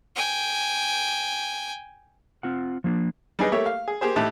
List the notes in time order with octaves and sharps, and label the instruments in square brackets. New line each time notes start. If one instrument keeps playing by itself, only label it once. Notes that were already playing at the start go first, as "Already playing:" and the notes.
[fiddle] G5 G#5
[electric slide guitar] C4 F4 F#5
F3 A#3 D4
[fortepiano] G3 D#4 G#4 B4 D#5
A3 A#3 G4 C#5 E5
F5
G#4
A#3 G4 G#4 C5
A2 D#4 E4 G4 A5 F#6